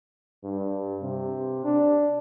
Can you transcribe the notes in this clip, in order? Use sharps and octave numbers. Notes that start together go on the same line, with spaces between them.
G2
C3
D4